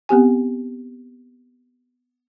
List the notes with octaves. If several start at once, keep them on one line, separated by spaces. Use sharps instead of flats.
B3 C4 G4 G#5